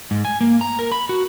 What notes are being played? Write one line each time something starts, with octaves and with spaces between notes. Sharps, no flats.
G#2
G#5
A#3
A#5
A#4
B5
F#4